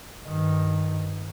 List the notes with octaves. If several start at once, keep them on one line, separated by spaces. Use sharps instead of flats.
G2 D#3